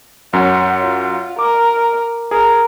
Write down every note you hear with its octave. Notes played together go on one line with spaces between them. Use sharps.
F#2 C#4 F#5
F4
A#4 D6
G#4 A#4